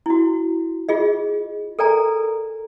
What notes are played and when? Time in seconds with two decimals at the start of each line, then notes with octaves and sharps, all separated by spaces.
0.06 E4 F#4
0.89 F4 G#4 D#5
1.79 A4 A#4 D5 G#5 A#5